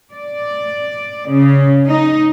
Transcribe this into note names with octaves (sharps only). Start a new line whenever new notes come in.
D5
C#3
D#4